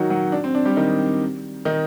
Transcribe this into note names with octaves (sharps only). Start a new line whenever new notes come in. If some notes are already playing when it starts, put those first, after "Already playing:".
Already playing: D#3 F#3 D#4 F#4
F#3 F#4
D4
C4
D4
G3 G4
D#3 D#4
D#3 D#4